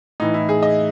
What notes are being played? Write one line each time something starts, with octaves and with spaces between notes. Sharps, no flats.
A2 E3 D#4
E4
G#4
D#5